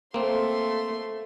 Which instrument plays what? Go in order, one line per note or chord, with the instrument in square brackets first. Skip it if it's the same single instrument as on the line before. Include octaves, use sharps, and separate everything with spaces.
[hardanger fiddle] A3 C6 [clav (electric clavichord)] A#3 C4